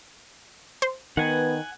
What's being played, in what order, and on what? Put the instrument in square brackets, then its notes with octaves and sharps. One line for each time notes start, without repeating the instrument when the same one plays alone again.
[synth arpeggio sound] C5
[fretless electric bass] D#3 [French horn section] B3 B4 [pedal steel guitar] F#5 G#5